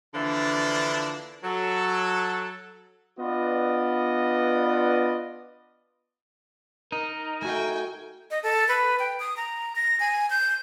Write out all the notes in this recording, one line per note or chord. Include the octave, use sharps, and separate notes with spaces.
D3 E3 F3 A#3 D4
F#3 A4
B3 D4 F4 B4 D5 D#5
D#4 A#4
A3 F#4 G5 G#5
D#5
A4
B4
G5
D#6
A#5
A#6
G#5
G6